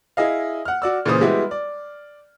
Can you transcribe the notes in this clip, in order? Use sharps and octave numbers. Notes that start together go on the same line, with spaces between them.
E4 G#4 D#5 F5
F#5 F6
F#4 D5 E6
A#2 C#3 E3 C#4 C5 D#6
G3 G#3 B3 E4 F#4 G4
D5